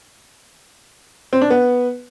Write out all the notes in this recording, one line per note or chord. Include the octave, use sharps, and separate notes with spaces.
C4
D4
B3